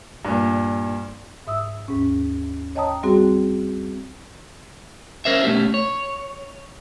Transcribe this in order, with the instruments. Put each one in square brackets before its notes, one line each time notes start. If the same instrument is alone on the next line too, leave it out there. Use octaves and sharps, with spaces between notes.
[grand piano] G2 A#2
[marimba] G#2 E5 D#6 E6
D#2 G#2 C#4
C#5 D#5 G5 A5 A#5 D#6
G3 C4 F#4 G#4
[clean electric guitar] C#4 A#4 C5 E5
B2 A3 C#4 G4
C#5